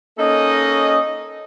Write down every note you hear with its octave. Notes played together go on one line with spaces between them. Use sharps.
A#3 C#4 D#4 A4 D#5